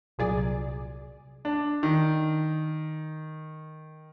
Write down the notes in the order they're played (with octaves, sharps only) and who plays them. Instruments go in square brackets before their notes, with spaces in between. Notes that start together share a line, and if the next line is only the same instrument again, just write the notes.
[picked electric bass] C2 F#3 [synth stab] A#2 G#4 D5
[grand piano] D4
D#3